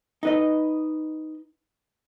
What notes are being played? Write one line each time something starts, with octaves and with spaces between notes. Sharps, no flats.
D#4 B4 D#5